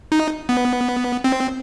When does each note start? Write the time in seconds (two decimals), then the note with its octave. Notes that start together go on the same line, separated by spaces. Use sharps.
0.12 D#4
0.49 B3
1.24 C4